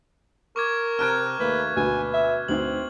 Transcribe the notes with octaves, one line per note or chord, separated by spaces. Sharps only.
A#4 C#6 D6 G#6
C3 C4 A5 A#5 F6 F#6 G#6 D7
D#2 A3 A#3 B4
D2 B2 B4 G#5
E5
D2 C4 D#4 G#6 F#7